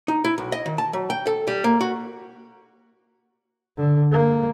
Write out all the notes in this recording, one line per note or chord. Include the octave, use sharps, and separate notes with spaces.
D#4
E4
B1
D#5
D#3
A5
F#3
G5
A4
G3
A#3
F#4
D3
A#3